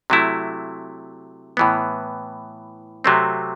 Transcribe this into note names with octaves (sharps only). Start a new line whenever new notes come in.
C3 F#3 A3 E4
A2 E3 B3
C3 F#3 A3 C4